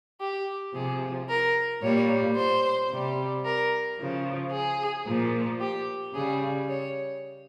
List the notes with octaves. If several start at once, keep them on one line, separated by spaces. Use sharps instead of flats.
G4
C3 F3 G#4
A#4
A#2 G3 C#5
C5
C3 G3
A#4
C#3 F3
G#4
A#2 F3
G4
C#3 G3 G#4
C#5